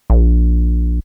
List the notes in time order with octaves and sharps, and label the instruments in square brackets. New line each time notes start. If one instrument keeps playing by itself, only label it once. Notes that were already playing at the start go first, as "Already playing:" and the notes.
[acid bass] A#1